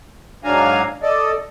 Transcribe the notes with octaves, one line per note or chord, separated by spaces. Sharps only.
G#2 F#3 D4 F5 G#5 A#5
A4 D5 D#5